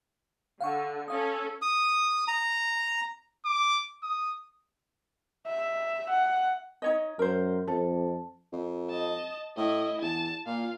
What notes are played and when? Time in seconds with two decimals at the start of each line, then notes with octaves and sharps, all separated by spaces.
0.61 D3 F5 F#5 C#6
1.08 C#4 A4 F5 D#6
1.62 D#6
2.28 A#5
3.46 D6
4.03 D#6
5.47 E5
6.09 F#5
6.82 D#4 C#5 D#5
7.19 F#2 A#4 C5
7.68 F2 A4
8.52 F2
8.90 D#5 A5
9.57 A2 E4 D#5
10.02 E2 A5
10.46 A#2 F4 F5